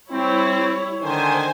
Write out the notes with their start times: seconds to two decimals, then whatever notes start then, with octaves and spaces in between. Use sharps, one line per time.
0.12 G3 C4 E4 C#5
1.03 D3 D#3 C5 G#5